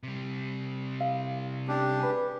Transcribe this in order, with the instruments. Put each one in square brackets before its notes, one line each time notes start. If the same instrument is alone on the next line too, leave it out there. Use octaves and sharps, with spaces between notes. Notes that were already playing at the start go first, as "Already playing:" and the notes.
[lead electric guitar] C3 G3
[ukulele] F5
[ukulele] C#4 A4 [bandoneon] D4 G4
[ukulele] G#4 B4